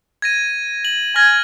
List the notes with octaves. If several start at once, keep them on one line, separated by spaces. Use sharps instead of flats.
G#6 A#6 D#7
F#7
G#5 F6 G#6 A#6